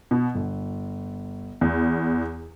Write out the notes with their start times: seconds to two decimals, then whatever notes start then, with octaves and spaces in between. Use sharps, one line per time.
0.11 B2
0.35 G1
1.61 E2